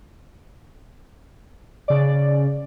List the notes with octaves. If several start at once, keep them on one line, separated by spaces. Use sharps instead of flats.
C#3 D5